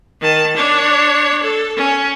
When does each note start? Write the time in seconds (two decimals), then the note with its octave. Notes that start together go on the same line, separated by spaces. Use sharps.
0.21 D#3 A5
0.56 D4 C#5
1.43 A4
1.77 C#4